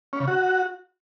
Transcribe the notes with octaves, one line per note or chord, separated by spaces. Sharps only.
C#4
C#3
F#4